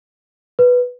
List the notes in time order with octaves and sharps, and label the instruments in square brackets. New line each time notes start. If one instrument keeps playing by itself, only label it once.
[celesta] B4